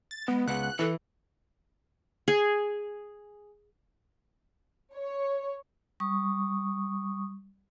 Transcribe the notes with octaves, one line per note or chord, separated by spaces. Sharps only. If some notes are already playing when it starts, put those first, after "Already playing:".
A6
G#3 B3
C#2 B3 F#5 F#6
E3 A4
G#4
C#5
G3 C#6 D#6